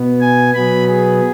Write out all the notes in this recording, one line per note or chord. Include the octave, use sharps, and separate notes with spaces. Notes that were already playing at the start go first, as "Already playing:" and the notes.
Already playing: B2 B3
G#5
B2 F#3 B3 B5
G#4